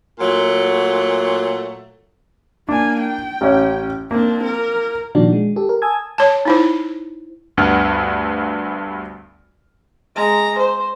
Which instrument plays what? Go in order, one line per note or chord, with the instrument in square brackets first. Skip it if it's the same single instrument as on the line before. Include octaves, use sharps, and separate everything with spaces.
[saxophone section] A#2 F#3 A3
[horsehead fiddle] A#3 G#5 [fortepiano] D4
[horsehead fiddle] G5
[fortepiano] A1 C#4
[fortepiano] A#3 [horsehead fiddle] C4 D4
[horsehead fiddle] A#4
[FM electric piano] A#2 D#3 F3 D4 F#4
G#3
G4 A4
A#4
G#5 A5 D#6 E6 G#6
[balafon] C#5 A5
D#4 E4 C5
[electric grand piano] D2 G2 B3 D4 F#5 F6
[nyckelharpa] G#3 A#5
C5